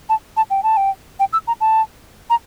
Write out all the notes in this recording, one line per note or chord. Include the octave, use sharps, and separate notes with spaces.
A5
A5
G5
A5
G5
G5
E6
A#5
A5
A#5